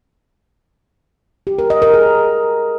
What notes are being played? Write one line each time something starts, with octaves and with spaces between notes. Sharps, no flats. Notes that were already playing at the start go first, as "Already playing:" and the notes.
G4
A#4
D#5
A#4
G#4